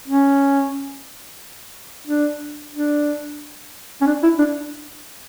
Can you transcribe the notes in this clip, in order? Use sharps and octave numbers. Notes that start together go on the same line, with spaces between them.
C#4
D4
D4
C#4
D4
E4
D4